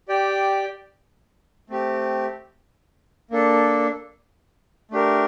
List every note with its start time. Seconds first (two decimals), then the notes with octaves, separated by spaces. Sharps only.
0.08 G4 D5 G5
1.70 A3 C4 G4
3.31 A#3 D4 A4
4.91 A3 D4 G4 A#4